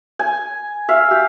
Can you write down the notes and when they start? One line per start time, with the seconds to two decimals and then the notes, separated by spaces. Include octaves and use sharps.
0.19 G#5
0.89 E5 F5
1.11 G4